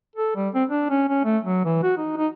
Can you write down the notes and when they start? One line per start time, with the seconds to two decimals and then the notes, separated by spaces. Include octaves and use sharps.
0.16 A4
0.36 G3
0.55 C4
0.70 D4
0.90 C#4
1.09 C#4
1.24 A3
1.43 F#3
1.65 E3
1.83 F#4
1.97 D#4
2.17 D#4